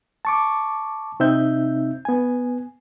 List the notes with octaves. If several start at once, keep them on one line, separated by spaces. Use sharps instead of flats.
A5 C#6 D6
C3 C4 D#4 E5 G6
B3 G#5